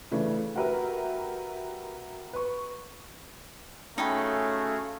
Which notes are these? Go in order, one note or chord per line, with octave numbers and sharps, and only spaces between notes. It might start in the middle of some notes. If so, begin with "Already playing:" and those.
C#3 E3 A3 D4
F#4 G4 A#4 B4 E5
B4 C#6
A3 C#4 D#4 F#4 G#4 F5 G5 B5